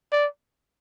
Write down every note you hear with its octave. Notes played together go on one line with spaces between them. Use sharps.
D5